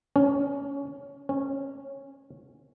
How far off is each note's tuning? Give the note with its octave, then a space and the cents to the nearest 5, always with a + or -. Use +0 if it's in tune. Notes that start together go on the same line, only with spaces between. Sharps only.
C#4 +15
C#4 -15